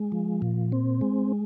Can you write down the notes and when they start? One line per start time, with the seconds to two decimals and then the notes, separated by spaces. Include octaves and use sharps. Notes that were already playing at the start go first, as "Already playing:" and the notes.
Already playing: G#3
0.12 F3
0.42 A#2
0.72 C4
1.01 G#3